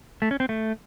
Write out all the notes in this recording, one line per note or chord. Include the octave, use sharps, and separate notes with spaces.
A3
C#4
C4
A3